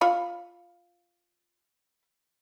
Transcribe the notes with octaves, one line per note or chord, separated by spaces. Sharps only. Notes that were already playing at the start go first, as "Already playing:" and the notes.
F4 C#5 B5